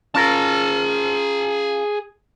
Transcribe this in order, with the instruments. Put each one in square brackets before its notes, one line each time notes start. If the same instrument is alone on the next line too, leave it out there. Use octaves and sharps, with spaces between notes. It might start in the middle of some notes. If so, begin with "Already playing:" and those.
[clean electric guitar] C#4 F4 A#4 [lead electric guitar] G#4 A5